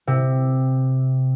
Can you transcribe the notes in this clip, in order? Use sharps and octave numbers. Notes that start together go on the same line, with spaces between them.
C3